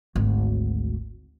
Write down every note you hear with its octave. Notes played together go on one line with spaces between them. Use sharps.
G#1 D2